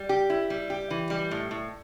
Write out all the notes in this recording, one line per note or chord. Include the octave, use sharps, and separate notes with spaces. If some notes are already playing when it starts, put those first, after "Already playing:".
Already playing: G3
G4
E4
G3
G4
E3
G3
A2
A2